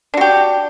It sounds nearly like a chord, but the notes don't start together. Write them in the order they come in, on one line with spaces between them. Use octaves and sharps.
D4 F#4 G4